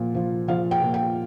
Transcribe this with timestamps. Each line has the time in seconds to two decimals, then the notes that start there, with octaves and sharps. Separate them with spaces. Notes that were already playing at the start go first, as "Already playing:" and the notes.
Already playing: A#2 F3
0.15 F3
0.48 F3 F5
0.71 G5
0.82 A#2
0.94 G5